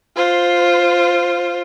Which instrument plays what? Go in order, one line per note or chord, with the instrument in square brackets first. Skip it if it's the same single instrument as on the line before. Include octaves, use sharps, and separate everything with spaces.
[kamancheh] F4 C5